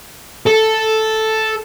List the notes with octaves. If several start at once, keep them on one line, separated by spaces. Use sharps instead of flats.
A4